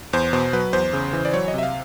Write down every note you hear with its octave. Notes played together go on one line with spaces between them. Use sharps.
E2 C5
B2 C5
F#3 B4
E2 C5
C#3
E3
D5
F#3 C#5
D#5
C3 E5
F5